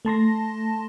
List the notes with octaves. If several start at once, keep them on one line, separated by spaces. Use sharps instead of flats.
A3 A5 C6 A#6